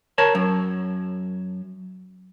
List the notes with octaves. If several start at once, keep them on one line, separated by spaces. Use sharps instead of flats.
A#4 C#5 A5
F#2